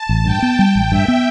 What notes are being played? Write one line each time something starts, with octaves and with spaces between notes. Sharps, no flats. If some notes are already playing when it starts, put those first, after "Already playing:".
Already playing: A5
A1
G2 G5
B3
G3 G5
A1
G2 E5
B3